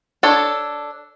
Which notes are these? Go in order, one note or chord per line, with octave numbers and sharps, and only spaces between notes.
D4 A4 C#5